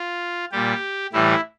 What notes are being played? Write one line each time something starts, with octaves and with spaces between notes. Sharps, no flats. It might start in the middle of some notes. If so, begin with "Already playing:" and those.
Already playing: F4
A#2 G3 G4
A2 E3 G3 E4